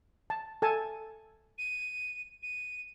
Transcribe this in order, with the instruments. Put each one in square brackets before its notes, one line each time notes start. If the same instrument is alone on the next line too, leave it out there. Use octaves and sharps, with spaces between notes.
[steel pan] A5
A4 G#5 A5
[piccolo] D#7
D#7